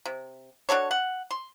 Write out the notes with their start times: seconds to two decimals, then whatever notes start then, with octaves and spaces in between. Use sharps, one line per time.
0.06 C3
0.69 D4 F#4 A4 C#5
0.91 F#5
1.31 C6